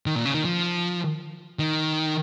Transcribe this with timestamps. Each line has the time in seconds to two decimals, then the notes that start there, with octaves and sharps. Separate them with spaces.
0.06 D#3
0.15 A#2
0.25 C#3
0.34 D#3
0.45 F3
1.59 D#3